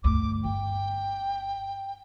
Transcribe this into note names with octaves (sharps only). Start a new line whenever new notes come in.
D2 G2 D6
G1 G5